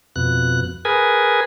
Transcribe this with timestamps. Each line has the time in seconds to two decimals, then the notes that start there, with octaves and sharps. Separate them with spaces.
0.16 F2 B2 F#6
0.85 G#4 A#4 B4 G#5